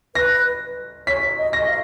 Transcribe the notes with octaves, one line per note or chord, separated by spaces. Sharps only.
B4 A#6
C#5 B6
D#5
A#6
D#5
F5